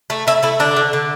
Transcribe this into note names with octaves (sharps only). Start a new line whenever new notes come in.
A3
A3 E4
A3 E4
D3 D4
D3
D3